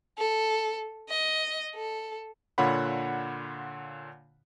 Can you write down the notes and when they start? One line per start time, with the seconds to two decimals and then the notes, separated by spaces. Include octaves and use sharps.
0.18 A4
1.09 D#5
1.76 A4
2.58 A#2 D3 F4 C#5 F#5 B5